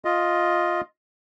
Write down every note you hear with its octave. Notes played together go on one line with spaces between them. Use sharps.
F4 D#5